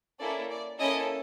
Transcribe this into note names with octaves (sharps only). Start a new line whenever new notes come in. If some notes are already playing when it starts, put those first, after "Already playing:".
A#3 C#4 E4 A4 D5
D5
A#3 C#4 E4 A4 D#5